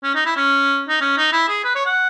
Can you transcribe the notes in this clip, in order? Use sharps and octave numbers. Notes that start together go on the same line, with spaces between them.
C#4
D#4
E4
C#4
D#4
C#4
D#4
E4
G#4
B4
C#5
F#5